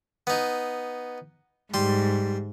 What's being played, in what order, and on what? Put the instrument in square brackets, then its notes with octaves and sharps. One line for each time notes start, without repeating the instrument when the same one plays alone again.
[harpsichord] B3 D#4
[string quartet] G#2 [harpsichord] G3 C6